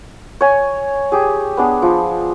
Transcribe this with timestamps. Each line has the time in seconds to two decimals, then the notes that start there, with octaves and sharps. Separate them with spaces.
0.41 C#5 G#5
1.12 G4 G#4
1.57 B3 D4 G#4
1.82 F3